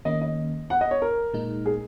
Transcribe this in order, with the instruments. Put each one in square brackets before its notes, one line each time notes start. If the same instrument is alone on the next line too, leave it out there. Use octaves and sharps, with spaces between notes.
[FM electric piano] D#3 A#3 C#4 [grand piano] D#5
[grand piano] D#5
F#5
D#5
C#5
A#4
[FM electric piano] A#2 G#3 D#4
[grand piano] G#4